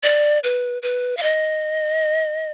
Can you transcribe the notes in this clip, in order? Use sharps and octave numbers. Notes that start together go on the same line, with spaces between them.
D5
B4
B4
F5
D#5